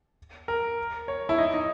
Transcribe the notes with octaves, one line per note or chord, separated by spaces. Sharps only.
A#4
C#5
E4
D#4
D#4